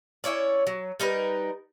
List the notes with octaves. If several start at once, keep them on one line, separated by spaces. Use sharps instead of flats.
C#4 E4 C#5 D5
F#3
G3 D#4 A#4 B4